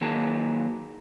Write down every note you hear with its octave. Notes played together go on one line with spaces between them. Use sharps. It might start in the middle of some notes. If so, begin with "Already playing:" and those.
D#3 F#3 A#3 G#4 A5